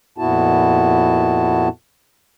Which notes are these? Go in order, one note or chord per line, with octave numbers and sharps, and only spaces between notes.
F2 A#2 B3 E4 F#4 A5